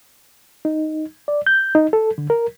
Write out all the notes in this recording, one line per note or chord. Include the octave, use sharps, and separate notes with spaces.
D#4
D5
G6
D#4
A4
D3
A#4